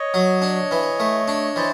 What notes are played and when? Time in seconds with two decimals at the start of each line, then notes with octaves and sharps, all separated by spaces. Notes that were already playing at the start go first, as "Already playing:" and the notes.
Already playing: C#5 D#5
0.14 F#3
0.42 D4
0.71 E3
1.00 A3
1.28 D4
1.56 E3 C5 D5